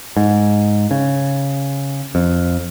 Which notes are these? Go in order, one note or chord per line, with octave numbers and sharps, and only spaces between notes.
G#2
C#3
F2